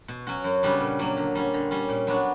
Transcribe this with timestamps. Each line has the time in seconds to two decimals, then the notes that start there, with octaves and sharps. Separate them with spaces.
0.08 B2
0.27 F#3 C#4 F#4
0.44 F#2
0.63 C#3 G3 B3 D4
0.80 A#2
0.99 F#3 A#3
1.17 D3
1.35 G3 C#4
1.54 D3
1.71 G3 C#4
1.89 A#2
2.07 F#3 B3 D4 F#4